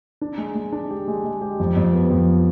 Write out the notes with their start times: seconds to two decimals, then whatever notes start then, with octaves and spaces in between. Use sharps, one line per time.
0.21 D4
0.38 G#3
0.55 G#3
0.72 D4
0.90 G4
1.08 G#3
1.24 G#3
1.42 G4
1.60 F2
1.76 F2
1.93 B3
2.10 F2